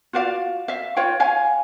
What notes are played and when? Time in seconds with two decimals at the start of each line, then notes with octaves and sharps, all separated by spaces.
0.13 F4 F#4 D5 F5
0.68 E5 F5
0.96 F4 C#5 F5 G5
1.20 C#5 F5 G#5